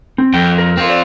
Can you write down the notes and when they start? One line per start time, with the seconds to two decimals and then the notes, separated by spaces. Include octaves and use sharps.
0.18 C4
0.34 F2 G5
0.58 A#4
0.77 C4 F4
0.90 C5 D5